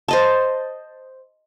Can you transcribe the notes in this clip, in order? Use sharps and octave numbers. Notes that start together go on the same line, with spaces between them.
C5 D#5 A5